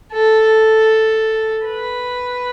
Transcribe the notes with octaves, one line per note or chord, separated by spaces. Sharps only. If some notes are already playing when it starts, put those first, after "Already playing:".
A4
B4